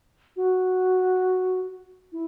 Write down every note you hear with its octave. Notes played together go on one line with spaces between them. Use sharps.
F#4
E4